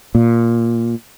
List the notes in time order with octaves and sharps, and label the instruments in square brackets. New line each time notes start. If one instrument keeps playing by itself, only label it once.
[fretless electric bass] A#2